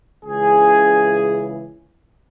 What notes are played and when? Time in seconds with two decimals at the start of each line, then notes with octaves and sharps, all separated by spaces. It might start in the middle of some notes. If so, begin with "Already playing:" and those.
0.25 C#2 C#3 E3 G#4